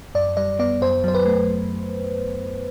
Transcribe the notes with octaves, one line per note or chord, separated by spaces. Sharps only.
F#2 D5
G3 D5
B3 D5
F#2 C5
F#3 C5
B4
A3